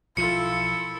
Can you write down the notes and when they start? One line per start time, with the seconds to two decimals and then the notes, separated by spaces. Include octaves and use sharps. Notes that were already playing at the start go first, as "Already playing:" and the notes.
0.17 B1 F3 E4 F4 A4 C#7